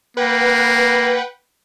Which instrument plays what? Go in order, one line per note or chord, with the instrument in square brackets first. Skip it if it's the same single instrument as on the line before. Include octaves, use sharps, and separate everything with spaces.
[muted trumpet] A#3 [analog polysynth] B4 F#5 G5